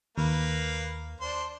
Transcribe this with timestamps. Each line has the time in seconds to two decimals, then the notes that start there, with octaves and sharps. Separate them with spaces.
0.18 D#2 A#3 B4 F5
1.21 D4 C5